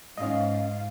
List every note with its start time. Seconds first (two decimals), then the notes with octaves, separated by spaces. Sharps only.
0.18 G#2 C#4 D#5 F5